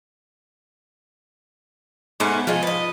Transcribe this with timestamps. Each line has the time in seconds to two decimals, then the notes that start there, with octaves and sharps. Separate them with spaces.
2.20 G#2 A3 B3 C#4
2.47 F3 F4 G#4 D#5
2.63 B4 D#5